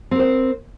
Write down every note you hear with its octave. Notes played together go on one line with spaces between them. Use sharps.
C4 A#4 C5